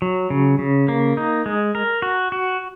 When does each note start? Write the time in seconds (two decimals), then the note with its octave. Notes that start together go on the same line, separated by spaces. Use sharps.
0.02 F#3
0.30 C#3
0.59 C#3
0.88 A#3
1.17 D#4
1.46 G#3
1.75 A#4
2.02 F#4
2.32 F#4